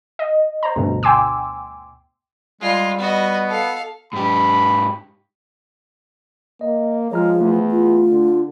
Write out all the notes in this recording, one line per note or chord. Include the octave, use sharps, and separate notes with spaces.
D#5
C5 A#5
D2 G2 B2
G5 G#5 C6 D6 E6
G3 G#3 F4
B3 F#4 D#5
A4 F5
G#2 G4 B5
A#3 D#5
F3 G#3 C#5 A#5 F6
E2 A3
F4
D3